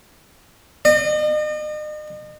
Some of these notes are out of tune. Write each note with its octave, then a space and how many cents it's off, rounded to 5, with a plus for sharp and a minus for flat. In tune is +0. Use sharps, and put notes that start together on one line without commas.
D#5 -40